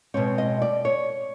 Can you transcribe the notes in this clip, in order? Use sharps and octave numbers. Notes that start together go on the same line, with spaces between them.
B2 G#3 C4 C#5
D#5
D5
C#5